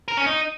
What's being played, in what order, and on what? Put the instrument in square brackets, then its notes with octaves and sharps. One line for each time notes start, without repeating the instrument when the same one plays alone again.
[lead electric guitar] A#4
C#4
D#4